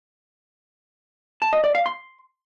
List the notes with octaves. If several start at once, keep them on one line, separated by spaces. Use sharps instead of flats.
A5
D#5
D5
F5
C6